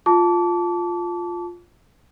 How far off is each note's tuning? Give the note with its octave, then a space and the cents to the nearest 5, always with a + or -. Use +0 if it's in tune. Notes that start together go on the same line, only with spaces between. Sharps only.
F4 +0 A5 -5 D6 -30